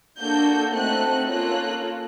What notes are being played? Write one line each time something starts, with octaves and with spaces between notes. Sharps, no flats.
A#3 D4 F#4 A4 G6
A3 C4 D#4 F#4 A4 F#6
A#3 C#4 F4 A4 F#6